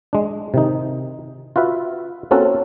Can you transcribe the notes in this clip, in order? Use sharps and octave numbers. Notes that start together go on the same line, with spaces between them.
G#3 D4
C3 D#3 D#4
F4 F#4 B4 E5
A#3 C4 C#4 F#4 A4